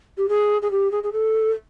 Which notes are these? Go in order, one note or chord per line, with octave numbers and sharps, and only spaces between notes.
G4
G#4
G#4
G4
G#4
G#4
A4